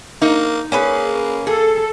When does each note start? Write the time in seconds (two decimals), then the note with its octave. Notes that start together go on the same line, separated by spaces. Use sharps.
0.22 A#3 D#4
0.72 A#3 C#4 G#4 B4
1.47 G#4 A4